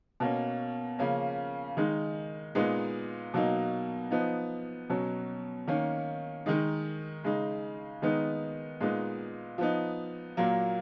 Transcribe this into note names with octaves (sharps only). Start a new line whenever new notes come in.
B2 A#3 C#4
C#3 F3 A#3 C#4
D#3 G#3 D#4
A#2 G#3 B3 D#4
B2 F#3 A#3 D#4
F3 B3 D#4
B2 F#3 C#4
D#3 A#3 C#4
D#3 G#3 D#4
C#3 G#3 D#4
D#3 G#3 B3 D#4
A#2 G#3 B3 D#4
F3 B3 D#4
A#2 F#3 A#3